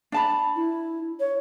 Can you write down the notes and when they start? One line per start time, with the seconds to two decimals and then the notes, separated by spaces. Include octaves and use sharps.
0.12 D4 A5 B5
0.56 E4
1.20 C#5